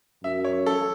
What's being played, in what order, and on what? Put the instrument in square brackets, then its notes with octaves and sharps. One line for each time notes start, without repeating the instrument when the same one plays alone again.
[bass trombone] F#2 [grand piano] E5
[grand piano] C#5
A4